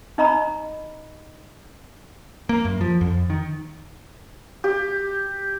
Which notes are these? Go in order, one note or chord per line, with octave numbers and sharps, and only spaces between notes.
D#4 D#5 A#5 B5
A#3
F#2
F3
F2
D#3
G4